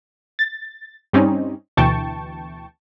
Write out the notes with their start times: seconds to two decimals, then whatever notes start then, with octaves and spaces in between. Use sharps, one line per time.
0.39 A6
1.13 G2 G3 C4 C#4 D#4
1.77 D2 B2 E3 G5 A5 C#6